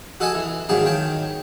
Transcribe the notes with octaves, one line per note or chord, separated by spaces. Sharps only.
F#4 A4 D#5 F#5 G#5 A5
E3
G#2 D#3 F#3 A#3 G#4 A5
D#3 C#5 G5 A5